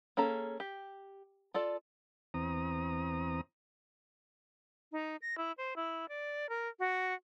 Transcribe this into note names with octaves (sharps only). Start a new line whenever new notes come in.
A#3 C#4 G#4 A4 A#5
G4
F4 A4 D5
E2 C4 A#5 D#6
D#4
A#6
E4
C5
E4
D5
A#4
F#4